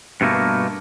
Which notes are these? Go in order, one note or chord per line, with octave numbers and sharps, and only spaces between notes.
G2 B2 A3 A#3